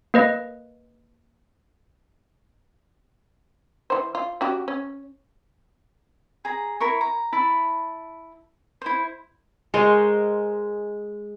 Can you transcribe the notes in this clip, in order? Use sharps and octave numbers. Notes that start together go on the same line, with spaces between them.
A#3 B4 D#5
E3 C5
F4
C#4 F#4 G4
C#4
G#4 A#5
E4 A#4 C#6
A#5
E4 A5 B5
E4 C5
G#3 A#4 C5 C#5